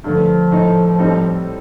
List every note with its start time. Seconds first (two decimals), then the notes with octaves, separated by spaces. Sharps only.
0.04 G2 D3 F3 A3
0.52 A2 A3 D#4
0.99 A2 G3 C4 D#4 A4